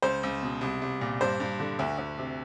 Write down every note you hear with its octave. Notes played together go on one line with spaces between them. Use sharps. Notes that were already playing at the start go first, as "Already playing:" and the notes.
C#2 C5
C#2
B2
C2
C2
A#2
G2 C5
G2
D3
D2
D2
C3